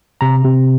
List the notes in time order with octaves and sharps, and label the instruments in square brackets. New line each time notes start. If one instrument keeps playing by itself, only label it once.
[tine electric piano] C3 A#5
C3